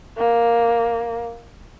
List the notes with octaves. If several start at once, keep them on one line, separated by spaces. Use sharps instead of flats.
A#3